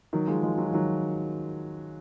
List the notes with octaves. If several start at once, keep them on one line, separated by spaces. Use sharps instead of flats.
D#3 F#3
F3 G#3
F3 G#3
F#3
F3
D#3 F#3